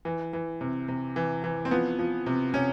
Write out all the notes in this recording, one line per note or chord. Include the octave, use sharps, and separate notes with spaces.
E3
E3
C3
C3
E3
E3
C4
F3 B3
F3
C3
C3 C#4